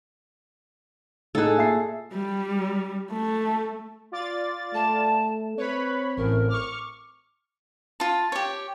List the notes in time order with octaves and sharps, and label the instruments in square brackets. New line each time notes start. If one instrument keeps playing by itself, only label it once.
[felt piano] A2 D#4 F#6 [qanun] G#4 A4
[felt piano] A#2 E5 C7
[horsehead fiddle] G3
A3
[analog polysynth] F4 D5 A6
[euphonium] A3 [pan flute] A5
[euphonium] C4 [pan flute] B4 [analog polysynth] C#5 B5
[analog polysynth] A1 A2 [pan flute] A#4
[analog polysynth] C#6 F6 [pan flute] D6
[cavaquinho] F4 A5
G4 C#5